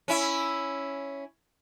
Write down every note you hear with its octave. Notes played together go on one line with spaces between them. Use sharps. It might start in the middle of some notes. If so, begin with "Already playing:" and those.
C#4 E4